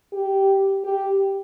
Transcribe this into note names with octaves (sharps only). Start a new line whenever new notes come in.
G4
G4